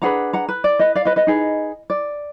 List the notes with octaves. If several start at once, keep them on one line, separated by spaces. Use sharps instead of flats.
D4 G#4 B4 F#5 A#5
F#5 A#5
B4
D5
B4 D#5
D5 F5
B4 D#5
B4 D#5
D#4 G#4 B4
D5